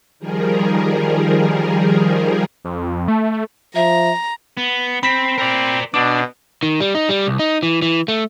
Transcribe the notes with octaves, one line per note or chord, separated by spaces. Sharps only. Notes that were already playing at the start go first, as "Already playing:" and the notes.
D#3 F3 G3 G#4 A#4
F2
A3
F3 E5 A#5
B3
C4 B5 B6
C4 A#4 D5
B2 D4 D6
D#3
G3
D#4
G3
C2
D#4
E3
E3
A3